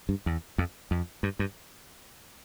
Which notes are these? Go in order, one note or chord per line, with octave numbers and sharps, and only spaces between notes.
G2
E2
F2
F2
G2
G2